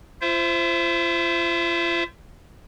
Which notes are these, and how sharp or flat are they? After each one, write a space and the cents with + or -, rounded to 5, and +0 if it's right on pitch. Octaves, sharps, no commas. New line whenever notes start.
F4 -35 C5 +0 E5 +25